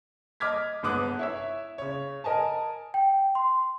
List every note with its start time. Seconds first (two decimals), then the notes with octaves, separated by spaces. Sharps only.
0.40 D#5 D6 F6 G#6 B6
0.83 G1 G#2 B3 D6 D#6 F#6
1.19 E4 C#5 E5
1.78 C#3 C#5
2.24 A#4 D#5 G#5 A5
2.94 G5
3.35 C6